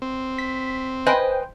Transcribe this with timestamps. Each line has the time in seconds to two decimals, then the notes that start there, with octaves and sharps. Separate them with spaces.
0.02 C4
0.38 B6
1.06 B4 C5 D#5 G5 G#5